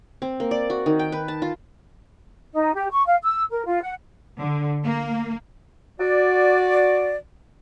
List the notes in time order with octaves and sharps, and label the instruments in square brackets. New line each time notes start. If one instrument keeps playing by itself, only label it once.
[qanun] C4
A#3
D5
F#4
D#3
G5
B4
A5
F4
[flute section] D#4
G4
C#6
F5
E6
A#4
F4
F#5
[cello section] D3
A#3
[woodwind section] F#4 D5